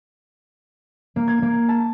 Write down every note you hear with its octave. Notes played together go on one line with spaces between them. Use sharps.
A#3
G#6
A#3
A5